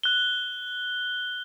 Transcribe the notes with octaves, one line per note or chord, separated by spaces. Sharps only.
F#6 G7